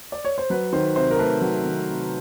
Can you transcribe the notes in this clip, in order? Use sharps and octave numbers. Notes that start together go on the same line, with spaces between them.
D5
C#5
C5
F#3 B4
D#3 C5
C3 C5
A#4
A3 B4
F#3
D#3
C3